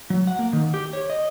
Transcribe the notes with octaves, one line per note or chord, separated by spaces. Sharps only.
F#3
F#5
A#3
D#3
G4
C#5
D#5